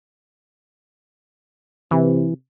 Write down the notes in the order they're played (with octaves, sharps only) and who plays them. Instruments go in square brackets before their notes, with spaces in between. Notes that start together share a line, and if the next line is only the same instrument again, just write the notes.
[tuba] C3 [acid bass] E3